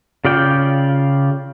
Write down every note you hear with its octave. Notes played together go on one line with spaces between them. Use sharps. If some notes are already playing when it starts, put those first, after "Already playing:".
C#3 F4 D5 G5